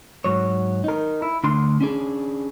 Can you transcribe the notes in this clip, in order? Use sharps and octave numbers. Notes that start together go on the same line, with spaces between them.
G#2 F#3 C#5
D#4 A#4
E4
D2 D4 C6
C#4 D4 G#4